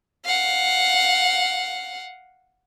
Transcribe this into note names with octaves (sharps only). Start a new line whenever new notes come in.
F5 F#5